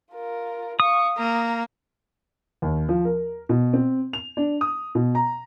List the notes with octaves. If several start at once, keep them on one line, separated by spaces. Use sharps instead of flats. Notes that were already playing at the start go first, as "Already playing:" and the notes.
F4 A#4
F5 C#6 D#6
A#3 A#5
D#2
F3
A#4
B2
C4
F7
D4
D#6
B2
A#5